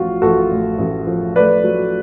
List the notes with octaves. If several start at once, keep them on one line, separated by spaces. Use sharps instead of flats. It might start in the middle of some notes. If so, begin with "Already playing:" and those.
Already playing: A1 F3 F4 F#4
A1 F#4 A4
A2
A1
F3
A3 B4 D5
F#3